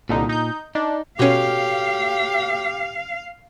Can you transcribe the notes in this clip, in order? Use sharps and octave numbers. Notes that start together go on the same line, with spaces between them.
C2 A#2 D3 D#4
D#4 G6
D4 D#4
B2 C#4 F#4 G4 A4 C#5 F5